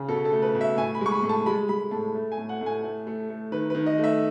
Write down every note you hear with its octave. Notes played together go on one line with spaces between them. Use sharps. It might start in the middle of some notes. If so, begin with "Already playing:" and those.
Already playing: C#3
B2 A4
A4
A3
B4
B2
E5
A2 G#5
B5
G#3 C#6
B5
A2
A5
G#3 B5
G#3 B5
A2 A5
A3
G#5
A2
F#5
A2
G#5
A3
A3
A3
D#3 B4
D#3 B4
D#5
A3
E5